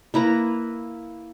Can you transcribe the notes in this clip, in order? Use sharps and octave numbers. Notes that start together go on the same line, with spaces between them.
A#3 E4 B4 A#5